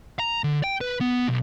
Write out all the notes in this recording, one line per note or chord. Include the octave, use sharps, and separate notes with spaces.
A#5
D3
G5
B4
B3
B1